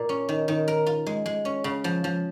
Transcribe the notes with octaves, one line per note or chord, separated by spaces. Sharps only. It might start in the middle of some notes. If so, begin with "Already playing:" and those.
Already playing: A#2
C#4
D#3
D#3
A#4
F4
G#3
G#3
C#4
C#3
F3
F3